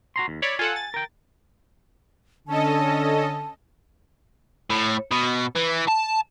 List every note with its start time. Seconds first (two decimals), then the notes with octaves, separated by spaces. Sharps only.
0.16 F#4 A#5 C6
0.28 D#2
0.42 E4 C#5 D5 B5
0.59 F4 A4 F#5 G#5
0.76 A6
0.94 A#4 G5
2.48 D3 C#4 A4 D#5 A5
4.70 A2
5.11 B2
5.56 E3
5.88 A5